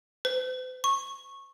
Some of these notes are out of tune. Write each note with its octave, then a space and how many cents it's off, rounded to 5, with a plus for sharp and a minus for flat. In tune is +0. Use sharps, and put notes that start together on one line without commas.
C5 -45
C#6 -10